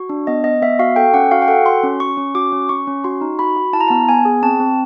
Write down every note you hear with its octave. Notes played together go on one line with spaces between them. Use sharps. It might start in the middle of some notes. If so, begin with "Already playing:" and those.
Already playing: F#4
D4
B3 D#5
B3 D#5
B3 E5
F#4 F5
A4 G5
C#4 F#5
F#4 F5
G5
A4 F#5
F#4 C6
C#4
C#4 C#6
C#4
F#4 D6
C#4
C#4 C#6
C#4
F#4 C6
D#4
F#4 B5
F#4
E4 A5
A#5
B3 A5
B3 G#5
G#4
C4 A5
C4